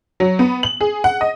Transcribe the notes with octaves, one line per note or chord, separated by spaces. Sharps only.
F#3
B3
F#7
G#4
F#5
D#5